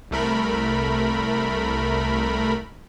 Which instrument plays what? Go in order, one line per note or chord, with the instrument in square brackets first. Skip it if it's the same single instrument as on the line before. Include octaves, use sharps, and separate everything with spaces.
[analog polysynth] C2 A3 A#4 B5